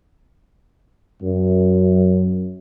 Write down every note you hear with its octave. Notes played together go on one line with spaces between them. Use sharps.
F#2